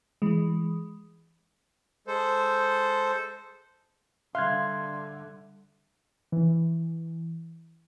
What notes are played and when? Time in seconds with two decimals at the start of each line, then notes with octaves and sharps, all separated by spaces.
0.22 E3 G#3
2.07 G#3 A4 C5
4.35 D3 G3 E5 F5 C6 F#6 G#6
6.32 E3